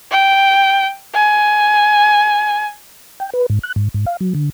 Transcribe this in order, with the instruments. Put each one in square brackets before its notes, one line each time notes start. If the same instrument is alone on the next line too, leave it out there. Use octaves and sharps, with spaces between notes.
[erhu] G5
G#5
[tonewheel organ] G5
B4
G#2
F#6
G#2
G#2
F5
F#3
D3